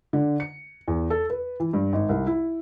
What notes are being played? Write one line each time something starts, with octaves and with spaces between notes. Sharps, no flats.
D3
C#7
E2
A4
B4
E3
G2
G#1
C2
E4